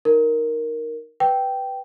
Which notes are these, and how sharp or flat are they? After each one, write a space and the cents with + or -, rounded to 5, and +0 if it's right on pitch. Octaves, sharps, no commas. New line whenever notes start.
D#4 +0 A#4 +0
B4 +0 G5 -10